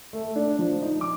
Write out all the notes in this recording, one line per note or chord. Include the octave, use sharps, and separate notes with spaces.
A3
D4
F3
D#4
D6